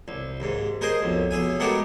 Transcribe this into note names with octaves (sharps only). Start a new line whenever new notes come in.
C2
D#2 G#2
G#4 A#4 C5 D#5 G#5
B1 F2
B1 G#4 E5 G#5
G#3 A3 B3 F#4 G4 A#4